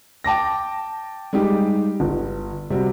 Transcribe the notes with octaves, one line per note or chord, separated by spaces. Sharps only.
G5 A5 D6 A#6
G3 G#3 D#4 G4
G1
C3 G3 F#4